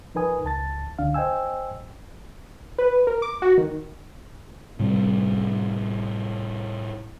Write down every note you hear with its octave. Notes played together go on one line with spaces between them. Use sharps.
F3 D#4 A#4 B4 G#5 D#6
C#2 A5 A6
C#2 D3 D4 F5
C5 D#5 G5 G#5 E6
B4
A#4
D6
F#4
D#3
A2 C3 G3